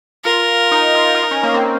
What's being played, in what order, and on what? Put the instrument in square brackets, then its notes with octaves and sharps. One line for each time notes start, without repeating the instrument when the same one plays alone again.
[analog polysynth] F4 [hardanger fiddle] A#4
[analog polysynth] D#4
F4
F4
D#4
C#4
A#3
C4